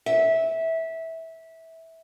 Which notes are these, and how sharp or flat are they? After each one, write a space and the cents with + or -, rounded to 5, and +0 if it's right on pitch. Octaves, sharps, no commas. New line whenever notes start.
E5 -15